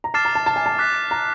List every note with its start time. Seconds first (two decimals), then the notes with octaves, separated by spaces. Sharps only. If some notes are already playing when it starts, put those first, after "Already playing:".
0.04 A#5
0.14 A5 D6 F6 A6 C7 E7
0.25 A#5
0.35 A5
0.46 A5
0.56 G#5
0.66 A5
0.79 D6 F#6 B6
1.11 A#5